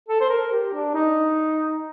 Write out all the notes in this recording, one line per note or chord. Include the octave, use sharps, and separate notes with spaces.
A4
C5
A#4
G4
D4
D#4